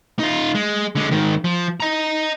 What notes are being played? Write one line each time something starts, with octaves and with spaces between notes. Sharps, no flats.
D#4 F4
G#3
D3 G#3
G#2 D#3
F3
D#5 A#5